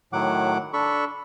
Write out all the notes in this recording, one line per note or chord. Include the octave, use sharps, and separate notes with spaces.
A2 D#3 F#3 F#5 D6
D4 A4 B5 C#6